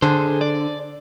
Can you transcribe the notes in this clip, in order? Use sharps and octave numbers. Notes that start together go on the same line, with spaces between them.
D3 G#4 C5
D5